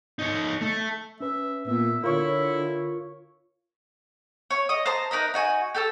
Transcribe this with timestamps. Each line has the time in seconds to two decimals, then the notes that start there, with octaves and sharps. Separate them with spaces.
0.19 D#4 C#5
0.61 A3
1.21 C#4 B4 E5
1.68 A#2 B3 E5
2.03 D3 E4 F4 A#4 C#5
4.51 C#5
4.69 D#5 D#6
4.86 C5 A5 A#5 C6
5.11 D#4 A#4 B4 D#5
5.34 D#4 F#4 G#5
5.75 G4 A4 A5 E6